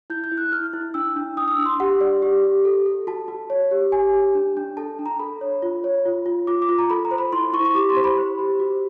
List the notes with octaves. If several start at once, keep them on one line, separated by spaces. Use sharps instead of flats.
E4 G6
G6
E4
F#6
E4 F6
E4
D4 E6
D4
D4 D#6
D#6
E6
D4
C6
G4 F#5
D5
G4
G4
A4
A4
F#4 A5
F#4
C#5
G4
G4 G#5
G4
D4
D4
A4 A5
D4
A#5
A4 B5
C#5
F4
C#5
F4
F4
F4 D6
D6
F4
A#5
A4 B5
A#5
C5
B5
E4 C6
E4 C#6
C#6
G4 D6
C6
C5
B5
C5
G4
F#4